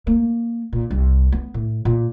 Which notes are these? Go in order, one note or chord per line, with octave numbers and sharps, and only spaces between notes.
A#3
A#2
C2
B3
A2
A#2